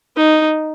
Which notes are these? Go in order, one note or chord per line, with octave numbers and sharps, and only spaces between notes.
D#4